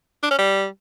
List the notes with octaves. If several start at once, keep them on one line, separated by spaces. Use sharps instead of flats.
D4
C#4
G3